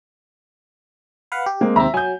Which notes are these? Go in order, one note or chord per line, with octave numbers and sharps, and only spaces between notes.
B4 F5 F#5
G4
G#3 A#3 C4
D#2 C3 C4 E5 A#5
F#3 G#5 G6